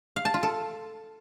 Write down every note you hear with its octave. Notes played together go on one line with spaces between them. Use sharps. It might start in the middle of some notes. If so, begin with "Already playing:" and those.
F5
A5
F4
A4